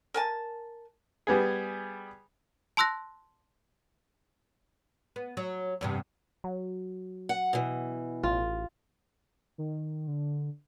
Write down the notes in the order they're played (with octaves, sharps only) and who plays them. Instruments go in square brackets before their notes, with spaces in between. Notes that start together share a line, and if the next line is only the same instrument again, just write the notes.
[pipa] A#4 G#5 A5
[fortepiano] G3 B3 G#4
[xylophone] A5 C6 E6 F#6 A#6
[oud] B3
F#3
E2 G2 C3
[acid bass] F#3
[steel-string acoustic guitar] F#5
B2 E3
[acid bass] A1 [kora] F4
[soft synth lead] D#3
D3